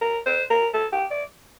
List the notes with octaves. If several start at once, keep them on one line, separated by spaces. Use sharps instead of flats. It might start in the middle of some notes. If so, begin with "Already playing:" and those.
A#4
C5
A#4
A4
G4
D5